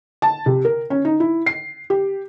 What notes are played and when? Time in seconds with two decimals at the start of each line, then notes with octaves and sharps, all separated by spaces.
0.22 A5
0.46 C3
0.65 A#4
0.90 C#4
1.05 D#4
1.20 E4
1.46 C7
1.90 G4